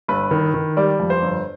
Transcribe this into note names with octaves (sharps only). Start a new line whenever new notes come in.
G1 B4
D#3
D#3
G3 D5
F2
C5
G1